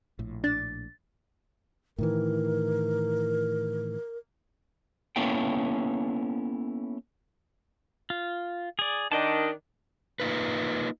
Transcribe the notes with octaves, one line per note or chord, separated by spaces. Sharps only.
A#1 A2
D4 A6
A2 D#3 E3 A#4
A#3 B3 C#4 E4 A4 G5
F4
G#4 D5
D#3 D4 D#5 G5 A5
A#3 D#4 F4 B4